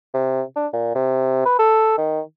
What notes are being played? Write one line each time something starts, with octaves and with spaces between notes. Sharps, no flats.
C3
D4
A#2
C3
B4
A4
D#3